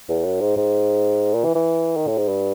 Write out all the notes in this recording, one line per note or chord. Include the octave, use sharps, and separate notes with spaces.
E2
F#2
G#2
G#2
A#2
E3
E3
D#3
A2
G#2
G2